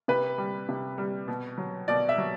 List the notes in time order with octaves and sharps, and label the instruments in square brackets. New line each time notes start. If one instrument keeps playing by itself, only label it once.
[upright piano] C3 B4
G3
C3
G3
B2
F#3
B2 D5
E5
F#3